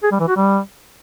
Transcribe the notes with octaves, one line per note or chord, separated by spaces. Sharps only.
G#4
G3
E3
F#4
G3